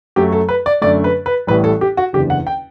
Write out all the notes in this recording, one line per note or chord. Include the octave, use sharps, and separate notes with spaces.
F#2 F#3 A3 G4
A4
B4
D5
F#2 D3 A3 D5
B4
B4
A1 A2 G3 B4
A4
G4
F#4
F#1 E2 D3 G4
F#5
G5